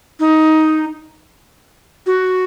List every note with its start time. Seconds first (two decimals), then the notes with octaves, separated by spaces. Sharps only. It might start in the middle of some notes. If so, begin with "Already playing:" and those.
0.20 D#4
2.06 F#4